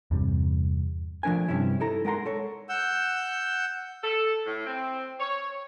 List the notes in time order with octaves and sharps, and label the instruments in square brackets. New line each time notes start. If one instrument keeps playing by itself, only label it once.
[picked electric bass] E2 G2 C3 G3
[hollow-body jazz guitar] F3 A3 D4 A#4 G#5
G2 C3 C#4 E4
D#4 E4 A4 A#5
G#3 A#4 F#5 A#5 C6
A4 C#5
[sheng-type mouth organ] F#5 E6 G6
[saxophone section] A4
A2
C4
C#5